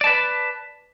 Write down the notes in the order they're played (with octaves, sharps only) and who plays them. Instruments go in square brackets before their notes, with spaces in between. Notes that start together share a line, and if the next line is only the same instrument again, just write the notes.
[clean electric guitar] D5
A5
B4